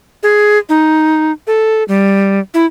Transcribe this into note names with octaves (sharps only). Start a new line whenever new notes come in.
G#4
D#4
A4
G3
E4